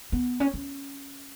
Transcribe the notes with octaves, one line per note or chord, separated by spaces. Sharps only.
B3
C#4
C#4